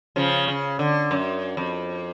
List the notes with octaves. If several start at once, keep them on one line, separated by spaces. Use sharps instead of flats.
C#3 F3
C#3
D3
F#2
F2